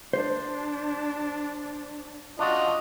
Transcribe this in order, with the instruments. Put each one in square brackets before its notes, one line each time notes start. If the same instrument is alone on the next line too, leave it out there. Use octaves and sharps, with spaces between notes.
[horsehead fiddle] D4 [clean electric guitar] C5
[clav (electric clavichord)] D4 F#4 [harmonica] F4 D#5